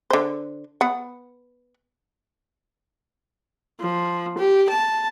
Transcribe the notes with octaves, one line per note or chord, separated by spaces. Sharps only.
D3 C5
B3 F#5
F3
G4
A5